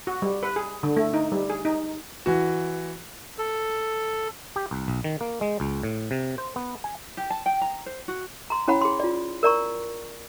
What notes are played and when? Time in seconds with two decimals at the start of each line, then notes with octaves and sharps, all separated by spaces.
0.07 F#4
0.22 G3
0.43 B4
0.56 G#4
0.83 D3
0.96 A3
1.14 D#4
1.32 G3
1.50 G#4
1.65 D#4
2.26 E3 F#4
3.38 A4
4.56 G4
4.71 C2
4.88 B1
5.04 D#3
5.21 A#3
5.41 G#3
5.60 C#2
5.83 A2
6.11 C3
6.38 C5
6.56 B3
6.84 G#5
7.17 G4
7.30 A5
7.46 G5
7.61 A#5
7.86 C5
8.08 F#4
8.50 A#5 C6
8.68 C#4 E4 C#5 F#5 B5
8.81 G#4 C6
9.00 F4 D5
9.43 A#4 D5 A#5 C#6